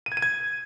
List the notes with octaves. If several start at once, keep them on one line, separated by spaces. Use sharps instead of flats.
D#7
G#6
D#7
G#6